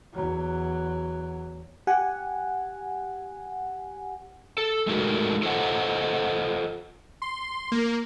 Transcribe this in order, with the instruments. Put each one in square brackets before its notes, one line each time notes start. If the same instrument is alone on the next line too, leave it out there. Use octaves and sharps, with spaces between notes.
[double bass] E2 F#3
[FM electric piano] G4 F#5 G#5
[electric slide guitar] A4
G#3 A3 D#4 F#4 A#4
F4 A4 C5 D5 D#5 F#5
[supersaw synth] C6
A#3